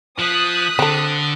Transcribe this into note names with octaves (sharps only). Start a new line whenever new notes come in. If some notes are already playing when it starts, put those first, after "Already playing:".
F3 D#6 F#6 B6
D3 C4 A4